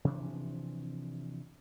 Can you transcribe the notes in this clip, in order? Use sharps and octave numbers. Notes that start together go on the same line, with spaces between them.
C3 E3 F3 D4